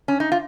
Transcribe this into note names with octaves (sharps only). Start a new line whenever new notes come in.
C#4
D#4
F4